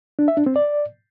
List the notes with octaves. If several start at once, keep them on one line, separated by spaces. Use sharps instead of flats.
D4
E5
D4
C4
D5